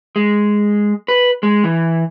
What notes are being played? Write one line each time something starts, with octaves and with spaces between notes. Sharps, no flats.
G#3
B4
G#3
E3